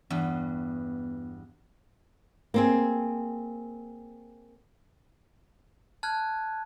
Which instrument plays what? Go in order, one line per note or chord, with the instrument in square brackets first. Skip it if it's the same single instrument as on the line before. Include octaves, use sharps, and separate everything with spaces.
[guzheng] E2 G2 [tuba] B3
[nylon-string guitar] A#3 C4 G#4
[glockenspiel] A5 F6 F#6 G#6